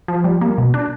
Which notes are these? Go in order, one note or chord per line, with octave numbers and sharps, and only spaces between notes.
F3
G3
A#3
B2
D4